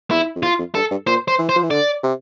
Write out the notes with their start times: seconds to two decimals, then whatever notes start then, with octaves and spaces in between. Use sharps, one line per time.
0.11 E2 E4
0.36 F2
0.42 E2 F4
0.59 F2
0.75 G2 A4
0.91 G2
1.07 A#2 C5
1.28 C5
1.39 E3
1.49 C5
1.56 F3
1.63 E3
1.70 D3 D5
2.03 C3